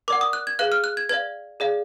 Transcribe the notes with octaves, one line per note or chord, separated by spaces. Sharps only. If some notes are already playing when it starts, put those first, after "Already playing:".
A#4 D5 F#5 D6
D#6
F#6
G#6
G#4 B4 F5 F#6
F6
F#6
G#6
B4 D5 F5 G#6
G#4 D5 F5